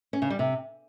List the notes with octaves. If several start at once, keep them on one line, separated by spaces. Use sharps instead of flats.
C#4
C#3
G3
C3